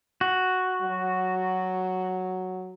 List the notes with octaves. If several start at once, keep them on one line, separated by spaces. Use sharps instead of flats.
F#4
F#3